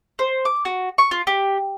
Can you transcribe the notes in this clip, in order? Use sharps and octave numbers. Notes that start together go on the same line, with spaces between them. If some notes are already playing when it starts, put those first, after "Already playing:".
C5
D6
F#4
C#6
F4
G4